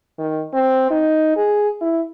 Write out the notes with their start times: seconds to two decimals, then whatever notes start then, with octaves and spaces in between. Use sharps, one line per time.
0.19 D#3
0.54 C4
0.90 D#4
1.37 G#4
1.81 E4